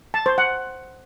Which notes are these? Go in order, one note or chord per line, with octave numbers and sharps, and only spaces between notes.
A5
C5
F#5